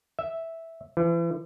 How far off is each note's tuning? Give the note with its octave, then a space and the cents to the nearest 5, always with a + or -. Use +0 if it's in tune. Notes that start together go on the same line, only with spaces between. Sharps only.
E5 -5
E3 +35